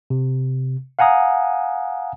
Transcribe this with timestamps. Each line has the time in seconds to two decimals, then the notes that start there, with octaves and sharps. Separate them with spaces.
0.10 C3
0.99 F5 F#5 G#5 A#5 D#6